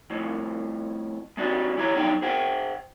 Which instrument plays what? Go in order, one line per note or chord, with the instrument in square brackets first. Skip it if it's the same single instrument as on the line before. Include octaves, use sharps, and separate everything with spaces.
[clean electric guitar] F2 A2 F3
G#3 C4 D4 F#4 G4
E3 E4 G4 C#5 A#5
E2 F#3 G3 D4 D#4 G5
G#4 C5 F#5 G5